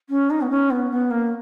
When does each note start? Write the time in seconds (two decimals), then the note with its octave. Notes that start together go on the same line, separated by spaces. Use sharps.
0.09 C#4
0.30 D#4
0.41 B3
0.50 C#4
0.70 B3
0.91 B3
1.10 A#3